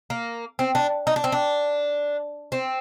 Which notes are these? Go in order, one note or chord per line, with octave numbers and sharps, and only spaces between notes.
A#3
C4
D4
D#4
D4
C4
D4
C4